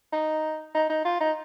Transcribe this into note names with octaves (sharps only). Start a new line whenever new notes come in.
D#4
D#4
D#4
F4
D#4